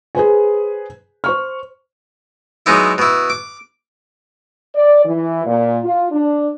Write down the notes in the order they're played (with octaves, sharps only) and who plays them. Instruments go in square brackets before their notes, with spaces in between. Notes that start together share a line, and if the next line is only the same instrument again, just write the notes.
[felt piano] G#4 B4 C5 G#5
C5 C#6 F6
[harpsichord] F#3 G#3 B3 D#4 E4
B2 E4
D6
[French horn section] D5
E3
A#2
F4
D4